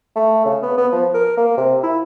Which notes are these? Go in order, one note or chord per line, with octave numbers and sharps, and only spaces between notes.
A3
C#3
B3
B3
F3
A#4
A#3
C3
E4